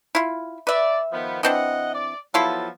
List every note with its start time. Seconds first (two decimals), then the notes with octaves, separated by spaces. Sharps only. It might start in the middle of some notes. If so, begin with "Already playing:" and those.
0.15 E4 F4
0.67 B4 D5 E5
1.12 D#3 F3 B3
1.43 E3 C4 D4 D#5 F#5
1.94 D5
2.34 F3 F#3 B3 E4 F4 A4